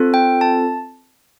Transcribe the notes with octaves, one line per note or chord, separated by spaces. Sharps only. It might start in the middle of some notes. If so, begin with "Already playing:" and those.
Already playing: C4 F4 A4
G5
A5